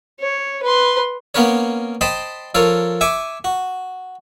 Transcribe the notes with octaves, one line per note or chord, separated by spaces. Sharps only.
C#5
B4 C6
A#3 B3 C#4 A#4 B4 C#5
C5 D#5 G5 A5 B5
F3 A4 A#4 C#5 A#5
E5 G#5 C#6 D6
F#4